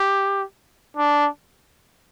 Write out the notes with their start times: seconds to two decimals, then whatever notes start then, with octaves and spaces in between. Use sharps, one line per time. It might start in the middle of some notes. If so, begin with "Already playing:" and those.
Already playing: G4
0.97 D4